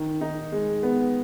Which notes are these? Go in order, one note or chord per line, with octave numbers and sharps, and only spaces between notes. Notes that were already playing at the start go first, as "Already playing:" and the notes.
Already playing: D#3
D#4
G#3
B3